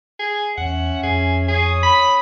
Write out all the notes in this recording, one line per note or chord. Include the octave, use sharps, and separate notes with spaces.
G#4
E2 C#4 E5 F#5
F2 G#4
G#4 C#5 D#6
B5